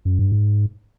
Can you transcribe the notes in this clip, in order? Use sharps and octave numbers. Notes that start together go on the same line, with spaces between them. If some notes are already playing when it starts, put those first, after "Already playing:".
F#2
G2
G#2